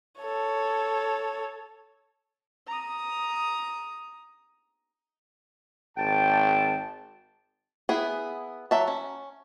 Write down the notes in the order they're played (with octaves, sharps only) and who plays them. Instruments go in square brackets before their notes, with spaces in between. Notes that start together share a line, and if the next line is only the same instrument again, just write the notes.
[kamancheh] A4 C#5
[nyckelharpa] A#5 D#6
[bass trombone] G#1 [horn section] G5 A5
[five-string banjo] B3 E4 G#4
F#3 E5 A5
C#4